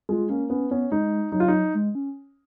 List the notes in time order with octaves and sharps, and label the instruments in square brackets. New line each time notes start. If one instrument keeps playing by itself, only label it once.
[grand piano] G#3 [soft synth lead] F4
[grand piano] A#3 [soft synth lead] C#4
[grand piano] B3 [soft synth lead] C#4
[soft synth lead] B3 [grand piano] C#4
[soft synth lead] G#3 [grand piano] D#4
[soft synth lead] F#3 [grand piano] D#4
[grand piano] F4
D#4
[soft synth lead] G#3
C#4